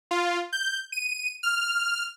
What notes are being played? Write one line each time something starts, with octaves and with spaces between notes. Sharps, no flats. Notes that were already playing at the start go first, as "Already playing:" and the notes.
F4
G6
D#7
F6